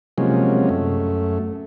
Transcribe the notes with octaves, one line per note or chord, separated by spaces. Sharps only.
C3 F3 F#3 G#3 A#3 C#4
F#2 A3